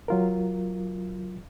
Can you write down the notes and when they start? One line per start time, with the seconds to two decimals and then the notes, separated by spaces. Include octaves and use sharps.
0.08 F#3 F4 A#4